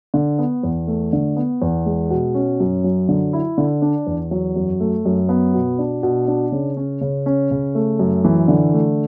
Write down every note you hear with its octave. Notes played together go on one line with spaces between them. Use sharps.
D3
B3
E2
A3
D3
B3
E2
G#3
B2
C#4
F#2
F#3
D3
E4
D3
D4
E2
F#3
F#2
A3
F#2
B3
B2
D4
B2
D4
C#3
C#4
C#3
C#4
C#3
A3
F#2
E3
D3
A3